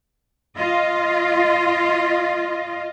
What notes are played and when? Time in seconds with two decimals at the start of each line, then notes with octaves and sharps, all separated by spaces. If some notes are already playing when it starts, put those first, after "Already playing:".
0.56 F4 D#5